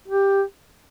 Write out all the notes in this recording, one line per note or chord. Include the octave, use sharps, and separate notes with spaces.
G4